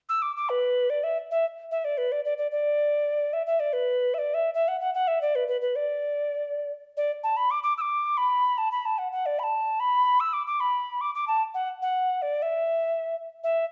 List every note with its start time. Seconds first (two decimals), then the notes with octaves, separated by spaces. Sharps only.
0.09 E6
0.22 D6
0.36 D6
0.49 B4
0.90 D5
1.04 E5
1.31 E5
1.71 E5
1.85 D5
1.98 B4
2.12 D5
2.25 D5
2.38 D5
2.52 D5
3.33 E5
3.47 E5
3.60 D5
3.73 B4
4.14 E5
4.19 D5
4.34 E5
4.54 E5
4.68 F#5
4.80 F#5
4.94 F#5
5.08 E5
5.21 D5
5.35 B4
5.48 B4
5.61 B4
5.76 D5
6.97 D5
7.24 A5
7.37 B5
7.51 D6
7.63 D6
7.78 E6
7.81 D6
8.17 B5
8.58 A5
8.72 B5
8.86 A5
8.98 F#5
9.12 F#5
9.26 D5
9.39 B5
9.43 A5
9.80 B5
10.20 E6
10.33 D6
10.47 D6
10.60 B5
11.01 D6
11.15 D6
11.28 A5
11.54 F#5
11.82 F#5
12.22 D5
12.42 E5
13.44 E5